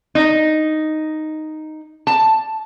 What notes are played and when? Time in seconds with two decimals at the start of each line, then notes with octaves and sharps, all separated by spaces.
0.15 D#4
2.07 A5